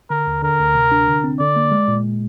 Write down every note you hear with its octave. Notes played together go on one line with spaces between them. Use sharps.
D3 A#4
D#2
D3 A#4
D2
C3
D4
D3
C4
D3 D5
A#3
G#3
A#2